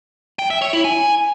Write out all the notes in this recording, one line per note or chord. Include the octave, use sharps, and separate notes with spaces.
G5
E5
C#5
E4
G#5